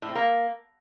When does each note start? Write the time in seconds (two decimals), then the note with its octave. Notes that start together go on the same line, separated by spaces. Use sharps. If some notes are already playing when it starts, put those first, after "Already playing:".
0.02 A2
0.09 C4
0.15 A#3